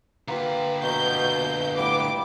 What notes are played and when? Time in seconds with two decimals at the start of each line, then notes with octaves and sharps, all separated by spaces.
0.28 D3 A#3 F4 G4 B4
0.83 B2 A#4 A#5 C#6 G6
1.78 A2 G3 B3 E4 D6